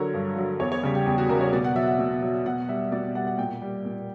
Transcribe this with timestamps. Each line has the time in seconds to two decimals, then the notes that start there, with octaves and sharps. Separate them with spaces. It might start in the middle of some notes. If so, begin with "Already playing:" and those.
Already playing: D3 F#3 A#4 C#5
0.14 G2
0.36 D3 F#3
0.60 E2 C#5
0.72 C#5
0.83 C#3 G3
0.95 G4
1.06 E2 G4
1.18 F#4
1.29 C#3 G3 A#4
1.41 C#5
1.53 B2 D5
1.64 F#5
1.76 F#3 E5
1.87 F#5
1.99 B2
2.22 F#3
2.45 B2 F#5
2.69 G3 E5
2.92 B2 D5
3.15 G3 F#5
3.27 F#5
3.38 A#2 G5
3.62 G3
3.85 A#2